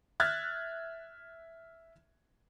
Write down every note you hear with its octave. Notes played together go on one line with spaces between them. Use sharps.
E5 F6 F#6 G#6 A6